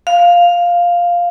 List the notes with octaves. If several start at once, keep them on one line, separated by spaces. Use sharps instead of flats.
F5